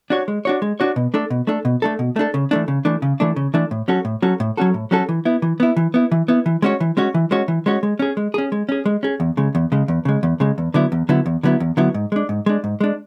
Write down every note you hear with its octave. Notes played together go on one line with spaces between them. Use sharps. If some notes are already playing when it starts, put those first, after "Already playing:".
D4 F#4 C#5
G#3
D4 F#4 C#5
G#3
D4 F#4 C#5
B2
A3 D4 A4
B2
A3 D4 A4
B2
A3 D4 A4
B2
A3 D4 A4
C#3
E3 A3 D4
C#3
E3 A3 D4
C#3
E3 A3 D4
C#3
E3 A3 D4
A2
F#3 C#4 F#4 A4
A2
F#3 C#4 F#4 A4
A2
F#3 C#4 F#4 A4
A2
F#3 C#4 F#4 A4
E3
B3 E4
E3
B3 E4
E3
B3 E4
E3
B3 E4
E3
G#3 C#4 F#4 C#5
E3
G#3 C#4 F#4 C#5
E3
G#3 C#4 F#4 C#5
E3
G#3 C#4 F#4 C#5
G#3
C#4 G#4
G#3
C#4 G#4
G#3
C#4 G#4
G#3
C#4 G#4
E2
C#3 G#3
E2
C#3 G#3
E2
C#3 G#3
E2
C#3 G#3
E2
D3 F#3 B3 E4
E2
D3 F#3 B3 E4
E2
D3 F#3 B3 E4
E2
D3 F#3 B3 E4
G#2
G#3 D4
G#2
G#3 D4
G#2
G#3 D4